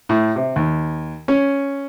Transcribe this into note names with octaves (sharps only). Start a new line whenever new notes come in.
A2
C3
D#2
C#4